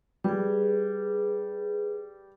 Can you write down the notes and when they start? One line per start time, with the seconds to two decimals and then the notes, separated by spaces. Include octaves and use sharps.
0.24 G3 G#4 B4